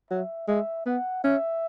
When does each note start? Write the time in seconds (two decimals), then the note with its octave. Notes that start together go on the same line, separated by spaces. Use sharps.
0.10 F#3 E5
0.48 G#3 E5
0.86 B3 F#5
1.24 C#4 E5